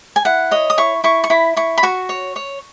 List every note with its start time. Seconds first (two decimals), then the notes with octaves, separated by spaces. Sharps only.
0.16 G#5
0.25 E4 F#5
0.51 C#5 D#5
0.70 D#6
0.78 E4 C#6
1.04 E4 C#6
1.24 C#6
1.30 E4 B5
1.56 E4 C#6
1.78 B5
1.83 F#4 C#6
2.09 C#5
2.36 C#5